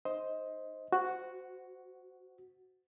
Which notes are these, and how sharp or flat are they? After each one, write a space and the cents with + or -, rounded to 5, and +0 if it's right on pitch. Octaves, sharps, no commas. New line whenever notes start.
D#4 -20 C5 +5 D#5 +15
F#4 +0 C5 -20